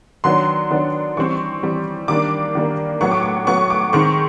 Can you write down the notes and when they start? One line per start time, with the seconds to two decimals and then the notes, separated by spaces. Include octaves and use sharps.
0.24 D#3 F#3 B3 D4 C6
0.71 D#3 F#3 B3 D4
1.17 E3 G3 C4 C#6
1.63 E3 G3 C4
2.08 D#3 G3 A#3 D4 D6
2.55 D#3 G3 A#3 D4
3.01 A2 F#3 B3 C#6
3.11 D6
3.23 C#6
3.47 A2 F#3 B3 C#6
3.70 D6
3.93 D#3 G#3 C4 C#6